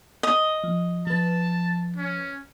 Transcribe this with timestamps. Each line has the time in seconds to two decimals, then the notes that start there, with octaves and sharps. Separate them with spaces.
0.23 D#5
0.64 F3
1.07 F3 B4 A5
1.96 C#4